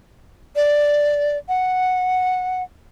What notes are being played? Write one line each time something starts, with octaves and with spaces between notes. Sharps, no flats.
D5
F#5